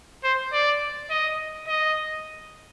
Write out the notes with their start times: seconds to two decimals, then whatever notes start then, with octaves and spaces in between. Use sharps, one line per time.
0.24 C5
0.53 D5
1.10 D#5
1.68 D#5